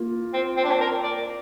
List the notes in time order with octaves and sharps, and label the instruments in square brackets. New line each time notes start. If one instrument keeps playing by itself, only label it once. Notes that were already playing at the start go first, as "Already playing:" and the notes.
Already playing: [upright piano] A#3 F4
[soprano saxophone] C4
C4
D4
C4
A#4
D5